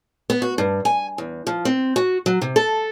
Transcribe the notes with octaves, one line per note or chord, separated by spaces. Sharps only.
B3
F#4
G2
G#5
E2
F3
C4
F#4
F#3
C3
A4